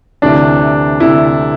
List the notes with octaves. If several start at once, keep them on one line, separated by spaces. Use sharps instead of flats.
D2 C3 E3 D4
D2 C3 E3 E4